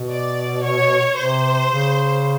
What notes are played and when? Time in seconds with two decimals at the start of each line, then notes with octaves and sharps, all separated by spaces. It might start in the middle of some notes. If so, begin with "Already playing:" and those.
Already playing: B2
0.10 D5
0.64 C#5
1.18 C3 C5
1.72 C#3